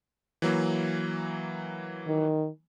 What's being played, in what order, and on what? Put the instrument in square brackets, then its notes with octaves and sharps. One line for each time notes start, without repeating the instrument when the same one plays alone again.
[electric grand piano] E3 F#3 A#3
[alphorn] D#3